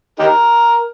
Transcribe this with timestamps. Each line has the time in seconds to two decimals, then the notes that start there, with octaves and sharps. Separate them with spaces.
0.19 D#4 G4 A#4